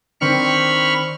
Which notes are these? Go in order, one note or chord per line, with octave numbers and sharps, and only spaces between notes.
D#3 C4 D4 B5 C#6 F6